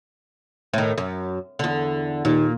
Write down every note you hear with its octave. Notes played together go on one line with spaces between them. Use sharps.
A2 D#3
F#2
E2 D3
D#2 A#2